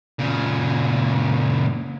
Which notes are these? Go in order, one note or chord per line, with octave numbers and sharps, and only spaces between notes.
A#2 C#3